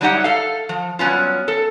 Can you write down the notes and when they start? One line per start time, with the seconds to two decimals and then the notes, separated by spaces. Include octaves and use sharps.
0.01 F#3 G3 D4 D#4 G4 F#5
0.24 A4 F5
0.69 F3
0.99 F#3 G3 B3 C#4 F4
1.48 A4